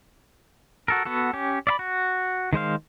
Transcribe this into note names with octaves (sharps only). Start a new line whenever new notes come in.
F#4 A4 A#4
B3 F#4 A4
C#4 G4
D5 E5 B5
F#4
D#3 G#3 C5 F5